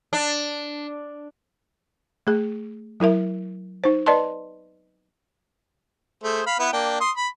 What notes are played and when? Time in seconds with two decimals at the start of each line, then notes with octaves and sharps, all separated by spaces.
0.13 D4
2.27 A3 G#4
3.00 F#3 E4 A#4 E5
3.84 D#4 C5
4.06 B4 D5 D#5 A5 C6
6.23 A3 G#4 C5
6.46 F5 B5
6.59 B3 E4 B4
6.73 A#3 D4 G5
7.00 C6 D#6
7.17 B5